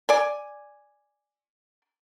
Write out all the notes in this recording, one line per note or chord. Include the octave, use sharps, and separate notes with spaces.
D5 G#5